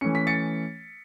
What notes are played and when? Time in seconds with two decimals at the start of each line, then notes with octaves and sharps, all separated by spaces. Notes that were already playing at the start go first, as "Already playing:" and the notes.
0.01 E3 A3 C#4 C#7
0.15 B6
0.27 A6 C#7